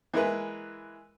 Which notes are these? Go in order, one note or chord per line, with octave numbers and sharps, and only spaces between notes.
E3 G#3 A#3 E4 B4